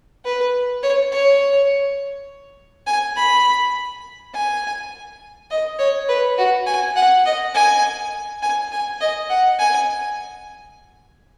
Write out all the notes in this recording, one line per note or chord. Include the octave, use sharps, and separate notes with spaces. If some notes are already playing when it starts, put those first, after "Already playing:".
B4
C#5
C#5
G#5
B5
G#5
D#5
C#5
B4
F#4
G#5
F#5
D#5
G#5
G#5
G#5
D#5
F#5
G#5